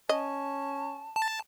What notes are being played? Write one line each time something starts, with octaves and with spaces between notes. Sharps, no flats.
C#4 D#5 A5
A5